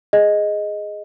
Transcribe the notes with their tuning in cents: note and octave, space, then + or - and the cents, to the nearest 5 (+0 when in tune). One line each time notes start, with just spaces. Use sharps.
G#4 +0 D#5 +0